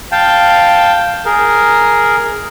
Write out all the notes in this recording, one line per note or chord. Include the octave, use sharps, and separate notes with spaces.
F5 G5 A5 G6
G#4 A#4